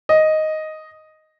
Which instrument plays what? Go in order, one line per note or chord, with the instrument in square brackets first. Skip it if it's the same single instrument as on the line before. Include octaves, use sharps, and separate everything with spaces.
[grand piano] D#5